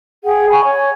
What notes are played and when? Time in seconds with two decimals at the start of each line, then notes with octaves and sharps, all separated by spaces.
0.23 G#4 F#5 G5
0.49 G#5 B5 C#6
0.64 C#5